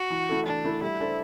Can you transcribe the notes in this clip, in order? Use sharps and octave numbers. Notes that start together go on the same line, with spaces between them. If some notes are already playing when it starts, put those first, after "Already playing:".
Already playing: F#4
E3
A3 E4 A4
E3 D4
A3 E4 A4
G3 E4
D4 A4 C5